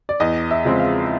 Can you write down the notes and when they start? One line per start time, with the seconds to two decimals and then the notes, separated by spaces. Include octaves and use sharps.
0.09 D5
0.20 E2 D#5
0.51 E5
0.65 C#3 F3 G#3 C4
0.80 F5